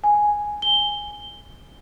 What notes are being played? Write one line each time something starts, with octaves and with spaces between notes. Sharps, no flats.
G#5
G7